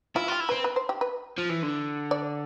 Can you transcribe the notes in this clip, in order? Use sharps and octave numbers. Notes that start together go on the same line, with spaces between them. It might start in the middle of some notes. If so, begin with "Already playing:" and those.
E4 F4
F4 G4
E4
C4 B4
B4
C5
G4
B4
F3
E3
D3
D5